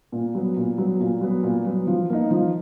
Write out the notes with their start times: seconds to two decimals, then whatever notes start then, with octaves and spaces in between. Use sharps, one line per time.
0.12 A#2
0.35 F#3 B3
0.56 A#2
0.78 F#3 B3
1.00 A#2
1.21 F#3 B3
1.43 A#2
1.66 F#3 B3
1.87 F3
2.10 A#3 D#4
2.31 F3